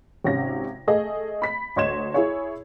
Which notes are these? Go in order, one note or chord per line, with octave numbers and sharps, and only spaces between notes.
G#1 C3 C#4 A#6
A3 G#4 D#5
B5 B6
D2 C#5 D#5 C6 G#6 E7
E4 G#4 C#5